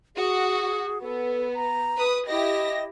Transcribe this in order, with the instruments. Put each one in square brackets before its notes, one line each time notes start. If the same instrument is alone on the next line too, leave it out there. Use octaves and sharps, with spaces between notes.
[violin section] F#4 [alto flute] G#4
[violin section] B3 [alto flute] A4
[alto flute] A#5
[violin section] B4 D#6
[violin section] E4 G4 A#6 [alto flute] D#5